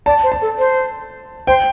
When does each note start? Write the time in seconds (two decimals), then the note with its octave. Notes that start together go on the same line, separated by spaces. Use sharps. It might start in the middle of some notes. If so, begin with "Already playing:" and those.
0.06 D5 A5
0.23 C5
0.32 A5
0.42 A4
0.59 C5
1.47 C5 G5